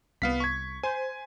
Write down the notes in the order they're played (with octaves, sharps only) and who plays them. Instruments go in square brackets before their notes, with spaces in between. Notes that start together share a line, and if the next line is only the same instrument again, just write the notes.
[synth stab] C2 [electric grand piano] B3 F5 B6
[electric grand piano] C#6 G#6
[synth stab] C5 [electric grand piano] G#5